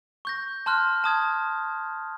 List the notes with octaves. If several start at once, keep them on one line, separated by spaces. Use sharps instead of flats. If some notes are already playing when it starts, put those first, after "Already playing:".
C#6 G6 A#6
A5 C6 F6 F#6
A5 D#6 G#6